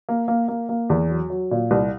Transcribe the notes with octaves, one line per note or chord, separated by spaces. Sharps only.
A#3
A#3
A#3
A#3
E2
F#3
F#3
A#2
C2